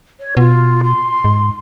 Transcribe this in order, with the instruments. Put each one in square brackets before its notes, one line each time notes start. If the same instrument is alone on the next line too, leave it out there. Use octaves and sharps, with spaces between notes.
[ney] C#5
[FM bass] B2 [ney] F4
[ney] C6
[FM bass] G#2